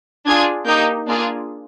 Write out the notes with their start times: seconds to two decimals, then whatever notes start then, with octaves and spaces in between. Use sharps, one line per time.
0.26 D4 F4 G#4 G#6
0.66 A#3 D#4 G4 G6
1.07 A#3 D4 F4 G#4